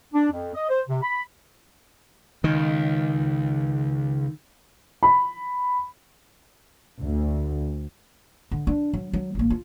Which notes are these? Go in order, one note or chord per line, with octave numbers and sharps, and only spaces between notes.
D4
F2
D#5
C5
C3
B5
C#2 D#3
B5
D2
D3
D4
F#3
F#3
A1 A#3
F4